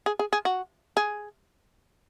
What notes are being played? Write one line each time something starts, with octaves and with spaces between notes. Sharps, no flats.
G#4
G#4
G#4
F#4
G#4